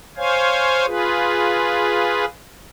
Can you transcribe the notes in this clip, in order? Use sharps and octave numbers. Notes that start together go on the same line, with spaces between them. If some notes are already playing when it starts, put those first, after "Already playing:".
C5 C#5 F5 G#5
F4 G#4 B4